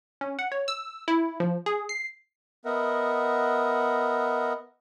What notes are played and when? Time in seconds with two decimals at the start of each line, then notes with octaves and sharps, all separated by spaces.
0.21 C#4
0.39 F#5
0.52 C#5
0.68 E6
1.08 E4
1.40 F3
1.66 G#4
1.89 C7
2.65 B3 A#4 D#5 E5 F#5